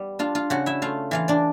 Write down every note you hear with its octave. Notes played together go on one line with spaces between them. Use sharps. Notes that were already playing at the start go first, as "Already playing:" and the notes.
Already playing: G3 B3
D4 F4 F5
F4 F5
C#3 F#4 F#5
E4 E5
A3 F4 F5
E3 F4 F5
D4 D5